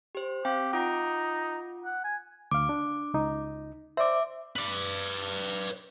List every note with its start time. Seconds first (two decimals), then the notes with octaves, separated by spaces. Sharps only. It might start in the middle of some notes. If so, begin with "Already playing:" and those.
0.15 G4 C5
0.45 C4 G4 F5 G5
0.73 D#4 F4 F#5 D6
1.85 F#5
2.04 G#5
2.51 D2 F5 D6
2.69 D4
3.14 C#2 D#4
3.97 C5 D5 E5 D6
4.56 B4 D5